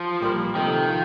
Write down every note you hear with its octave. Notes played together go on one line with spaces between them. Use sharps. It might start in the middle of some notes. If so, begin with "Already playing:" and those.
Already playing: F3
A#2 G3 A#3
C3 D#3 F3 A3
F4